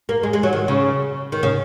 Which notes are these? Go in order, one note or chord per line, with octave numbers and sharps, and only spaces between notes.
A#3
G#3
G#3
F#3
D#3
C#3
D#3
C#3